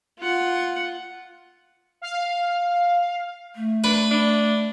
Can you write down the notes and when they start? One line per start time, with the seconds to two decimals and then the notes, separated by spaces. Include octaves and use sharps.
0.18 F4 F#5
2.02 F5
3.56 A3
3.84 D4 B4
4.11 D4